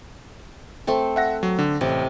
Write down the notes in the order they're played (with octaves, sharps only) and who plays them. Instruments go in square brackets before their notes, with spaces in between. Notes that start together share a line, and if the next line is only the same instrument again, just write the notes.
[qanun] A3 C4 A4
[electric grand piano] E5 F#5 A#6
F#3
D3
[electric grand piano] A1 [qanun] C3